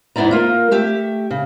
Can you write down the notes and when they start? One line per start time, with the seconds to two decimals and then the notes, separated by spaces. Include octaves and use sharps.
0.16 E2 G#2 B3 E4 D5 A#5
0.31 A#3 F4 A#4
0.71 A3 G4 E5
1.31 C#3